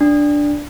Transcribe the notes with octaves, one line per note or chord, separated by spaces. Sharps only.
D4